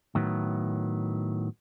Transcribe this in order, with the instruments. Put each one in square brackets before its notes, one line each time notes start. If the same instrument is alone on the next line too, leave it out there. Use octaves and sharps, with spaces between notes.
[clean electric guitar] A2 D#3 F#3 B3